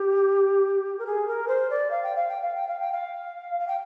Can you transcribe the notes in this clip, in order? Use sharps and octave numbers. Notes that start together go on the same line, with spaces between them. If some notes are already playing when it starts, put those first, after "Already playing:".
Already playing: G4
A#4
G#4
A#4
C5
D5
F5
G5
F5
G5
F5
G5
F5
G5
F5
F5
G5